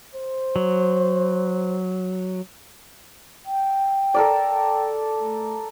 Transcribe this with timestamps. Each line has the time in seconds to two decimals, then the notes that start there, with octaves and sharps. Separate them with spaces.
0.15 C5
0.56 F#3
3.45 G5
4.14 A4 A#4 D5
5.19 A3